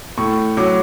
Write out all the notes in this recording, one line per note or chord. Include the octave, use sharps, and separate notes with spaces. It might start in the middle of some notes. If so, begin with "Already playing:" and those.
A2 C#6
F#3 D6